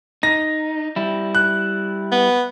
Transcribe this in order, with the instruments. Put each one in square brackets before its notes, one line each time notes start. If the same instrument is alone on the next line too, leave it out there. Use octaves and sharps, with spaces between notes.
[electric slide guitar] D#4 [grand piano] A#6
[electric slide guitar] G3 E4
[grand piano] F#6
[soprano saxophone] B3